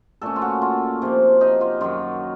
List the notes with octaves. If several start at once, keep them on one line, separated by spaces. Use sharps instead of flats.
A#2 A3 C#4 A4
F4
F#4
F4
C3 F3 A#3
D#4
F4
F#2 D#3 F#3 F4